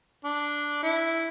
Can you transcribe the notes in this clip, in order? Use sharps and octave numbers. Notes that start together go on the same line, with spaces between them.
D4
E4